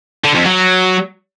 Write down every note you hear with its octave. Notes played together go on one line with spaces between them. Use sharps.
D3
F2
F#3